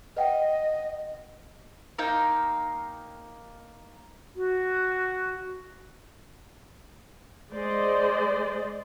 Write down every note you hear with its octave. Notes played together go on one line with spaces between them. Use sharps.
B4 D#5 F#5 G5
A#3 D#4 F5 G5
F#4
G#3 C5 D5 D#5